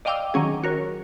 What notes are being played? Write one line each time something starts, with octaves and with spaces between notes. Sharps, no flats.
D5 D#5 F5 G5 D6 E6
D#3 F#3 C#4 G#4
F#4 A#4 C#5